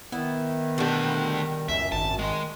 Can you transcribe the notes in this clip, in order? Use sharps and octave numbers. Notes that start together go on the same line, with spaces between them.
D#3 B3 E4
D2 B2 G3 D4
C#2 F#2 E5
G#1 A5
D#3 G#3